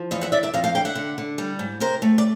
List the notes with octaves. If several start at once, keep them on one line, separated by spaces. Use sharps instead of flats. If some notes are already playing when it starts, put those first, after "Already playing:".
Already playing: F3
E2 D#5 F5
E5 F#5
E2 D5 E5
D5 E5
F2 D#5 F5
F5 G5
D3 F5 G5
E5 F#5
D3
D3
G3
G#2
C3 A#4 C5
A3
D5